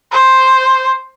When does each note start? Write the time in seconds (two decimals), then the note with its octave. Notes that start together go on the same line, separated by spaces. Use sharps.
0.13 C5